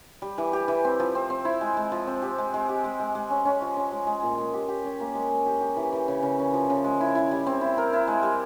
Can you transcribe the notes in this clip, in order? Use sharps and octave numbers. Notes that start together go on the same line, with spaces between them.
G3
E3
G4
E3
C4
F3
C4
C4
E4
G#3
G#3
F3
C4
G4
G#3
G#3
G4
G#3
G#3
G#3
C#4
C#4
F3
C#4
G#3
G#3
A#2
G#3
G4
G4
C#4
A#3
G#3
G#3
G4
G4
E3
E3
C#3
C#3
C#4
F3
C#3
G#3
E4
E4
G3
C4
E4
A#4
E4
G#3
G3